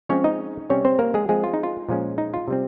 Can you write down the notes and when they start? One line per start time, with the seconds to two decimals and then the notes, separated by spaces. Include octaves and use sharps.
0.09 F3 G#3 C4 C#4 C#5
0.24 D#4 D#5
0.70 C3 G3 C4 C#4 C#5
0.85 C4 C5
0.99 A#3 A#4
1.14 G#3 G#4
1.29 F3 G#3 C4 G#4
1.44 F4
1.54 D#4
1.63 F4
1.89 A#2 F3 G#3 C#4
2.18 D#4
2.34 F4
2.48 C3 G3 C4